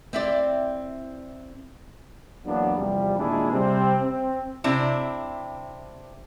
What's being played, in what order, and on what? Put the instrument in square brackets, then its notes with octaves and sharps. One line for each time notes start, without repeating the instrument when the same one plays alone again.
[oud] C4 E4 D5
[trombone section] E2 F#3 A#3 B3 D4
E2 C3 F3 G3
A#2 D#3 G#3 D4 E4 G#4
C3 G3 C4
C4
[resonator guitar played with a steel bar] C3 C4 D4 E4